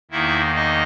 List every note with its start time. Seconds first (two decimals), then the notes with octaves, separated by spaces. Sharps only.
0.11 E2 D#3 A#3 D#4 E4 E5
0.55 D#4 D#5